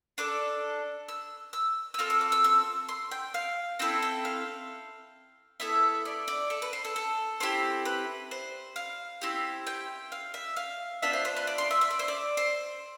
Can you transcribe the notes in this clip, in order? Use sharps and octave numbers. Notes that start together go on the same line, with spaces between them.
D4 A4 D6
E6
E6
E6
C4 F4 A4 F6
E6
D6
E6
E6
C6
G5
F5
C4 E4 A4 G5
G5
F5
B3 E4 A4 E5
D5
D5
A4
B4
C5
A4
A4
C4 E4 G4
B4
C5
F5
C4 E4 G4
G5
F5
E5
F5
B3 D4 F4 E5
C5
C5
B4
D5
C6
E5
E5
D5
C5
D5
C5